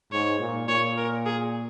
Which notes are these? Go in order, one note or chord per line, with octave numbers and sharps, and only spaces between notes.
G#2 C#5
A#2
A#2 C#5
A#4
G#4